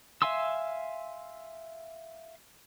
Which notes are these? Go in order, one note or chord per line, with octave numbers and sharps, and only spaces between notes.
E5 F5 G#5 C6 E6